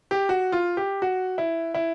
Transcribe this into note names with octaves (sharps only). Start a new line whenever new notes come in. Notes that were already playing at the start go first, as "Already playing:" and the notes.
G4
F#4
F4
G4
F#4
E4
E4